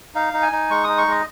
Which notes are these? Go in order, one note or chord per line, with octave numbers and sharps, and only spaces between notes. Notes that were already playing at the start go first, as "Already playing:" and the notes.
D#4 F5
D#4
G#5
D#4
G#3 C#6
D#4 D#6
C#6
G#3 D#5